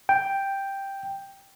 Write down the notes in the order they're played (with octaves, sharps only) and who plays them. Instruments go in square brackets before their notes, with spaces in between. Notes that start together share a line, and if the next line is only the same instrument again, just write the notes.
[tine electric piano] G5